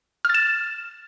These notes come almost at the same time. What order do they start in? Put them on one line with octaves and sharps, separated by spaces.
F6 A6 E7